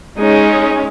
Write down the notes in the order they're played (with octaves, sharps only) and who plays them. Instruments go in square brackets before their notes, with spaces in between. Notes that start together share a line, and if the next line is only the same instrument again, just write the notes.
[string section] G#3 C#4 [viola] D#4